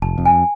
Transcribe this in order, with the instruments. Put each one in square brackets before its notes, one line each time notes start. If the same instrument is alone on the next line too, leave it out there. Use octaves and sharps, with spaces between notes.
[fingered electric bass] F1 [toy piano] A5
[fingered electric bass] F2
[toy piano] G#5